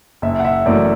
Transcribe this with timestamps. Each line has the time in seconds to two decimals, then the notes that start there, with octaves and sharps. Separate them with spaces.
0.22 F#1 E5
0.39 F#5
0.45 E5
0.66 F#2 E3 A3 D5